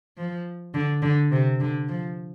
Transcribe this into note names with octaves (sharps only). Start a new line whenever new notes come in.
F3
D3
D3
C3
D3
F3